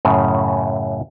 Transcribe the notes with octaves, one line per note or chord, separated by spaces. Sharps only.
F#2 A2 C#3